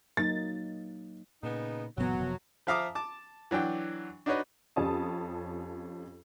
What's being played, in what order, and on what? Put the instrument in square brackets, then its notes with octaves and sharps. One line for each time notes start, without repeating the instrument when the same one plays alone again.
[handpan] F#3 A#3 D#4 [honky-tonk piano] A6
[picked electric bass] A#2 [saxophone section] C#3 B3 D#4
[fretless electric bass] F#1 B3 [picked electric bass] A#2 D3 E3 [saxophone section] F#3
[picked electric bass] F#2 C3 F3
[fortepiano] F3 E5 F5 A#5 D6 D#6
A5 D6
E3 F#3 D4 G5
D4 D#4 F#4 B4 C#5 D#5
[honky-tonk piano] F2 C#4 G4 A5 D#6